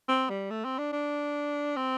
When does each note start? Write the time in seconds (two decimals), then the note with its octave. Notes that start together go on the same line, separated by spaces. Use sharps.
0.08 C4
0.30 G3
0.50 A3
0.65 C4
0.78 D4
0.93 D4
1.76 C4